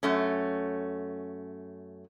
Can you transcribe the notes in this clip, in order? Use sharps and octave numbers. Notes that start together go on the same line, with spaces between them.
F#2 A3 C#4